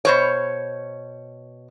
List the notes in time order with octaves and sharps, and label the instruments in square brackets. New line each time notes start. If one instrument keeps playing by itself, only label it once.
[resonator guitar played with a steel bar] B2 C5 C#5